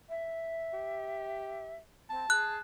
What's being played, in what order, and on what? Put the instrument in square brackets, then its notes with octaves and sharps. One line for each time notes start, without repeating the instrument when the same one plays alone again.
[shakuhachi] E5
[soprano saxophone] G4
[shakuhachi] C4 [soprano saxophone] A5
[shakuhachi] G#4 [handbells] F#6